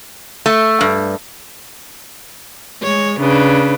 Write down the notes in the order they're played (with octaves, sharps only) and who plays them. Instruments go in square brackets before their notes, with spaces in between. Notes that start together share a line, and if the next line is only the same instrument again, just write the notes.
[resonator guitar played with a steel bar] A3
G2
[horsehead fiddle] G#3 [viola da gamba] C#5
[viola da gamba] C#3 [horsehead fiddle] D4 B4